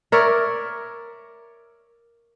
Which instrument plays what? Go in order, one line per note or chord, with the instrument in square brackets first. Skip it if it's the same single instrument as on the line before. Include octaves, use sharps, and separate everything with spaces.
[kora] A#4 C#5 D5 E5